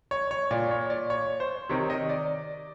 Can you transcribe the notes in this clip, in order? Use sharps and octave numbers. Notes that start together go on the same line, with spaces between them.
C#5
C#5
A#2 D5
C#5
D5
C#5
C5
C3 D#3 C#5
D#5
D5